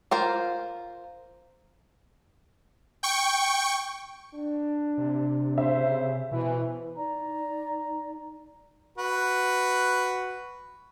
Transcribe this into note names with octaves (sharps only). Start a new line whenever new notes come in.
F4 A#4 C5
G5 C#6
D4
C3
C#3 C5 E5
B2 E3
D#4 D5 A#5
F#4 B4